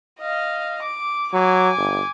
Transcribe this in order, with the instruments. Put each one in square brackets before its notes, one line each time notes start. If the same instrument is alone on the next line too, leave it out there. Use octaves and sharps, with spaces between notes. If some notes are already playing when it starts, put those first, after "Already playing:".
[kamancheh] D#5 F5
D6
[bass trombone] F#3 [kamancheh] G#5 D6
[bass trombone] G1